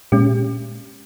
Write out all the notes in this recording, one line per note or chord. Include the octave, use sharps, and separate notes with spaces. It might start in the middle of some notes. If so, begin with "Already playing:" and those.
A#2 G#3 C#4 G4